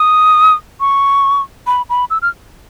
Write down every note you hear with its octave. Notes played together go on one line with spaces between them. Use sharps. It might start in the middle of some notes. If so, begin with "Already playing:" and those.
Already playing: D#6
C#6
B5
B5
E6
F6